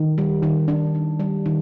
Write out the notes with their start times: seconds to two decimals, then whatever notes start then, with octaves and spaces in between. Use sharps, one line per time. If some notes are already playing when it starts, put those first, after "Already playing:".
Already playing: D#3
0.18 G3
0.43 D#3
0.68 D4
0.95 D#3
1.20 G3
1.46 D#3